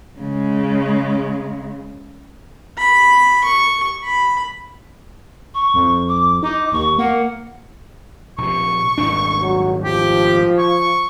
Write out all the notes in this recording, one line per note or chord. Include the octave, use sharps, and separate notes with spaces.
C#3 G#3
B5
C#6
B5
C#6
F2
D6
D#4 D6
D#2 C#6
A#3 F#5
A#1 C3 C#6
D#1 G#1 D4
F#3
F3 G4
C#6